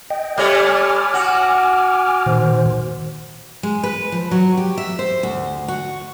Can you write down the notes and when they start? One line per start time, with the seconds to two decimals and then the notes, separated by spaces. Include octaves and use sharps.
0.10 D#5 G5
0.37 G3 A3 C#5 G#5 D6 F6
1.14 F#4
2.26 A#2 D#3 C5
3.63 G#3
3.83 B4
4.12 F3
4.31 F#3
4.57 G4
4.77 E5
4.99 C5
5.23 D2
5.68 F#4